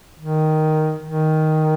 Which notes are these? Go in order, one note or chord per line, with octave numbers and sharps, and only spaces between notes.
D#3
D#3